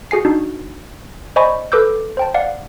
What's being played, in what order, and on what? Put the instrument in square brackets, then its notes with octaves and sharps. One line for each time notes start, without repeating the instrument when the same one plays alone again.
[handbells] F#4 G#4 G#5 C7
D4 D#4 F#4
C5 D5 D#5 G#5 B5 C#6
A4 B4 D6 E6 G6
C5 G5 A5
D5 F5 F#5